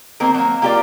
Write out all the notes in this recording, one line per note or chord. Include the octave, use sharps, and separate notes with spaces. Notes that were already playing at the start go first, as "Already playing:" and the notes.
D#3 A#3 C4 A#4
F#3 A#3
A#3 F4 G4 A4 A#4 D5